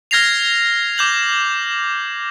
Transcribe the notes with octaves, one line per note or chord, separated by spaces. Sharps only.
F6 G#6 A#6 C7 F7
D6 G6 F#7